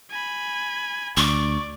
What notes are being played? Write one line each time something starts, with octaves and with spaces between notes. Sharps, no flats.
G#5 B5
D2 D5 C#6